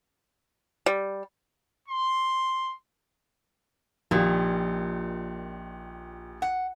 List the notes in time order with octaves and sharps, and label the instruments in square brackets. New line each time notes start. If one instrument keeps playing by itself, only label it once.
[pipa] G3
[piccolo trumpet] C6
[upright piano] A#1 G4 [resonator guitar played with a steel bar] A#2 D#3
[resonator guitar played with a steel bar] F#5